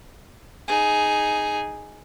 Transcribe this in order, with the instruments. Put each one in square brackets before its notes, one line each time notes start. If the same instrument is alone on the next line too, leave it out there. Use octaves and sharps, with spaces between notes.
[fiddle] D#4 G#4